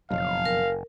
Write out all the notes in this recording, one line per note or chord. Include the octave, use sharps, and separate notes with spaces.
F#1 B1 F2 F5
A#4